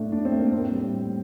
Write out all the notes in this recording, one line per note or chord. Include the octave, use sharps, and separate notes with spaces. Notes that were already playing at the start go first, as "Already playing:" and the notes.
Already playing: A2 A3 D4
A2 D4
C4
A3
A#3
A2 C4
G3
A2